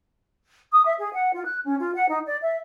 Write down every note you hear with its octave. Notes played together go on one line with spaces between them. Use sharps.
D#6
E5
G#4
F#5
F4
F#6
C#4
F4
F#5
D#4
D5
E5